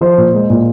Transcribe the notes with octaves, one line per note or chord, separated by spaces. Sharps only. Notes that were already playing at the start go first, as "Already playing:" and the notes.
F3 C5
A#2
G#3
A#2